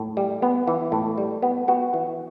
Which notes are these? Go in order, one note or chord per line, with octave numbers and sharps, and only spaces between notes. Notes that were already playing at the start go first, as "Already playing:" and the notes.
Already playing: A2
G3
B3
E3
A2
G3
B3
B3 F#4
E3